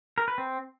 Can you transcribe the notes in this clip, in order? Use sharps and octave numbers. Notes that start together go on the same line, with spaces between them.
A#4
B4
C4